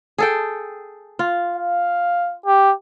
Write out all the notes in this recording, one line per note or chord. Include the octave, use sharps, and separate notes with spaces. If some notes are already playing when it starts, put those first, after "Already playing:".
G#4 A4 G5
F4
F5
G4